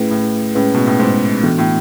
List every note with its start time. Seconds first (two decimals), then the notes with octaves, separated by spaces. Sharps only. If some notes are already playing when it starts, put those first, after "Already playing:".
Already playing: A2 A3 C#4 E4 G#4 B4
0.11 A2
0.55 A2 G#3 C#4 G#4 B4
0.74 B2
0.86 A2
1.00 G#2
1.43 A2 E3 B3 D4 F#4 A4
1.58 A2